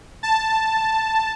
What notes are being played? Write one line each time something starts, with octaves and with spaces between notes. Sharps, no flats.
A5